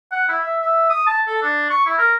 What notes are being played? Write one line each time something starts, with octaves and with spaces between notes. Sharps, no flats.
F#5
E4
E5
E5
D#6
A5
A4
D4
C#6
E4
A#4